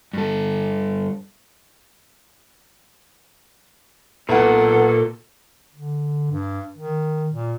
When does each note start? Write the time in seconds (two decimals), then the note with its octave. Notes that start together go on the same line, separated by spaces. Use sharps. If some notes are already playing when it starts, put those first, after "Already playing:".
0.13 G2 A4
4.29 B1 A#2 B3 A4 F#5
5.75 D3
6.31 G2
6.77 D#3
7.31 A#2